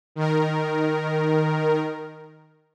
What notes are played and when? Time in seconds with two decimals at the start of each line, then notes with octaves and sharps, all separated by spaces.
0.16 D#3 A#4